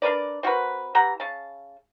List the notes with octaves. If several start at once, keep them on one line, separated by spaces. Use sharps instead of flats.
D4 A#4 B4 D5
C4 F#4 A#4 B4
E3 G4 F#5 A#5
C#3 A5